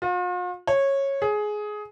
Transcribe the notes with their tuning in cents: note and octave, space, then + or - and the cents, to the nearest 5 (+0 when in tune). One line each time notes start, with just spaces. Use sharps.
F4 +45
C#5 -15
G#4 +15